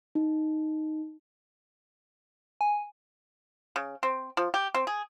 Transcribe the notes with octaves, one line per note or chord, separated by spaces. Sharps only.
D#4
G#5
C#3
C4
F3
G4
C4
G#4